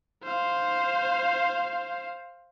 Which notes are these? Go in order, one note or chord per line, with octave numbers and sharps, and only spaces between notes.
C5 F5